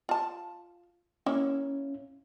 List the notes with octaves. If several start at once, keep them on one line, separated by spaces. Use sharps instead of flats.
F4 A5
A#3 C#4 E4